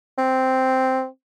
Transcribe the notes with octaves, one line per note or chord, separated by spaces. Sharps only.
C4